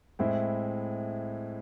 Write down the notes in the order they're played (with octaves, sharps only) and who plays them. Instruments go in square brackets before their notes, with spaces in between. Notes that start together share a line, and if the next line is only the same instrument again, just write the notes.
[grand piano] A2 G#3 C4 E4